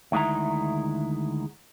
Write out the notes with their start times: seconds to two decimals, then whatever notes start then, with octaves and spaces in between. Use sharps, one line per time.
0.12 D2 D#3 G#3 E4 A#5